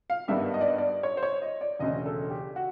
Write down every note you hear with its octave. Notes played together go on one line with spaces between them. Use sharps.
F5
G#1 G2 D#3 G3 B3 E5
D#5
D5
D#5
D5
C#5
C5
C#5
D#5
D5
E1 D2 C#3 D#5
A4
G4
F#4